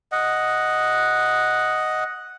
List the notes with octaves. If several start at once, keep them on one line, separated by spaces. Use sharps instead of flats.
D#5 F#5